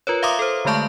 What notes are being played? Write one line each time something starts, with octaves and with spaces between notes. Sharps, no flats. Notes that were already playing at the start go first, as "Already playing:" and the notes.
F4 A#4 B4 C#5
E5 F5 A#5 C6 D6 D#6
A4 C5
D3 G#3 A3 D5 A5 C#6